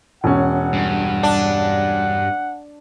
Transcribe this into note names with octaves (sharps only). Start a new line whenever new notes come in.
E1 C#4 F#5
G2
D4